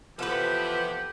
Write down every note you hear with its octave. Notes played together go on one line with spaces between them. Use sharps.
C3 E3 F3 B3 G4 A4 B4